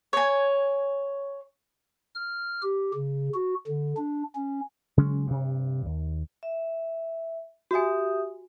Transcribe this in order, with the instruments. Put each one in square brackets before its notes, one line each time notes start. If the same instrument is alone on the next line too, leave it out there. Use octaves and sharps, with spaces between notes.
[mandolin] C#5 G#5
[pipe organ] F6
G4
C#3
F#4
D3
D4
C#4
[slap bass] C#3 F#3 G#3 C#4
G2 C3
D#2
[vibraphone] E5
[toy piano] F#4 G#5 [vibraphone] G4 E5 D#6